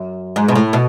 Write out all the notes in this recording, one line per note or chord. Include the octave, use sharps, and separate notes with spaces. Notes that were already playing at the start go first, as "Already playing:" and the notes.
Already playing: F#2
G#2
B2
A2
B2